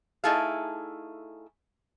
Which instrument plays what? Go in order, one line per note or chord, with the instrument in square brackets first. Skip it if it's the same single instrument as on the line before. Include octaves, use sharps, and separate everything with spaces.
[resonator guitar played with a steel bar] A3 D#4 E4 G#4 A4 F5